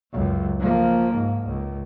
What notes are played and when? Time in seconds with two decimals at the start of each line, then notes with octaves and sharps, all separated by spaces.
0.12 C#2 F#2
0.59 F3 A#3
1.13 G#2
1.45 C#2